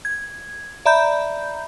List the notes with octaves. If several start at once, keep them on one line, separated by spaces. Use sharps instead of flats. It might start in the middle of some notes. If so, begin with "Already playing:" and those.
G#6
D5 E5 A#5 B5 G6